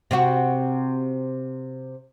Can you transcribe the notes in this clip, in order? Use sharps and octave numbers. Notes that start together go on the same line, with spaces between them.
C3 C4 F#4